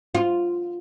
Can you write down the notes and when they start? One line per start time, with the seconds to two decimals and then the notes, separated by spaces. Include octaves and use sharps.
0.15 F4